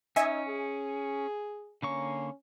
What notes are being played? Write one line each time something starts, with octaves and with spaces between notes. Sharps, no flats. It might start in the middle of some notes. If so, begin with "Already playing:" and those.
C#4 D#4 D#5 E5 G#5
G#4
D3 A#3 C#4 C#6